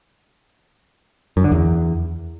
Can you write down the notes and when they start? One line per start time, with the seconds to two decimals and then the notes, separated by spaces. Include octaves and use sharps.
1.37 F#2
1.44 D3
1.52 E2